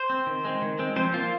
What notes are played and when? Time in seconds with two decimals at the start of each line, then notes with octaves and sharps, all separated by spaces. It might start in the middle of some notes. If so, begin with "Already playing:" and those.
Already playing: C5
0.10 C4
0.26 D#3
0.45 G#3 C4
0.62 D#3
0.79 G#3 C4
0.96 F3 C4 C5
1.13 A#3 F4